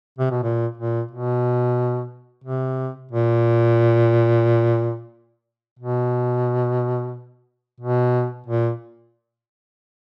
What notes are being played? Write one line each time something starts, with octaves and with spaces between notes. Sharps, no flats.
C3
B2
A#2
A#2
B2
C3
A#2
B2
B2
A#2